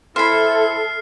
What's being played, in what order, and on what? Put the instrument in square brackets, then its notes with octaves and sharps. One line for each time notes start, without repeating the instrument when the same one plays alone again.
[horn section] E4 [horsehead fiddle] A4 [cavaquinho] C5 B5 [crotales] F6 C7